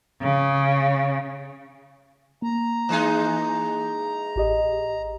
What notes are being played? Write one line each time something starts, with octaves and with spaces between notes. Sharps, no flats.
C#3
A#3 A#5
E3 G#3 D#4
A1 G4 D#5